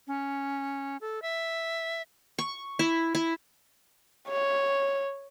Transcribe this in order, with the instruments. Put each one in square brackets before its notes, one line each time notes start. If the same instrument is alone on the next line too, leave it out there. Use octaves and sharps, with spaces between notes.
[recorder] C#4
A4
E5
[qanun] C#6
E4
E4
[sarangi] C#5